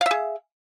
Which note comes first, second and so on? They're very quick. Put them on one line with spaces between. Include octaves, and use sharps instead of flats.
F5 E5 G#4